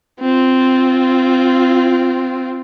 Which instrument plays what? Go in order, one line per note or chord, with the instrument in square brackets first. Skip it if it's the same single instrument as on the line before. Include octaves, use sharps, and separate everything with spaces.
[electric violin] C4 F4